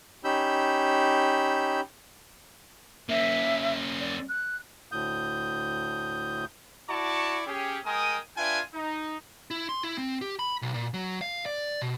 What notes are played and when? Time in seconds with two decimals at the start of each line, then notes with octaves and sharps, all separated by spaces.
0.24 C#4 D#4 G4 B5 E6 G6
3.09 A#3 C#4 E5
4.00 D5
4.28 F#6
4.92 D2 A2 D#6 G6
6.89 E4 F#4 D5 A5 C#6
7.46 C#4 G4 G#4
7.85 G#3 A#4 G5 G#5 D#6
8.37 D4 F4 B4 E5 G5 G#5
8.74 D#4
9.51 E4
9.69 C6
9.83 E4
9.98 C4
10.21 G4
10.39 B5
10.62 B1
10.74 A#2
10.94 F#3
11.21 F5
11.46 D5
11.82 B2